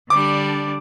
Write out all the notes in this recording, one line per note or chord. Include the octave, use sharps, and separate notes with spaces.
D3 G3 D4 D6